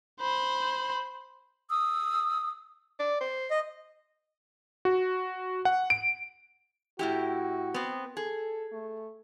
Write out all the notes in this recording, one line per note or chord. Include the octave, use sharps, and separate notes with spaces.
C5 B5
D#6 E6
D5
C5
D#5
F#4
F#5
D7
A2 E4 F#4 G4
B3 C4
G#4 A4
A3